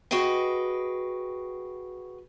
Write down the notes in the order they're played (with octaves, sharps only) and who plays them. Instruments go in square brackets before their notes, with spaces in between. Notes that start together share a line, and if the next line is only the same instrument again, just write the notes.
[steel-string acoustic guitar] F#4 G#4 B4 D#5 G5